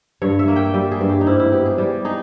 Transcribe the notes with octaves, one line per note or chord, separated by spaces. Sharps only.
G2 C#5
E5
A#3
G5
G3 E5
G#4
G2
G4
D#4
G#2 E4
E4
B3 G4
G#4
G3 G4
D#4 G#4